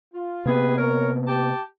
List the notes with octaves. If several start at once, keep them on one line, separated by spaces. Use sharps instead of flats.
F4
C3 A#3 B3 G4 G#4 B4
A#4 C#5
G4 A5